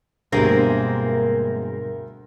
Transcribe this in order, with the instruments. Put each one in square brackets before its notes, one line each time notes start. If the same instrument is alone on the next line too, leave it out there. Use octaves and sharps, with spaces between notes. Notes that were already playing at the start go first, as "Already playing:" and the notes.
[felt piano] D2 [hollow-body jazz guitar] G2 B2 G4 [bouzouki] G#3 A#3 C4 [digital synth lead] A#4